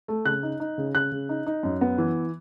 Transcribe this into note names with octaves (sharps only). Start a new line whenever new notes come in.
A3
C#3 F#6
D#4
D#4
C#3
C#3 F#6
C#3
D#4
D#4
F#2
B3
E3